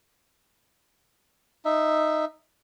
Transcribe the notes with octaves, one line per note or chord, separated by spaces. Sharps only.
D#4 E5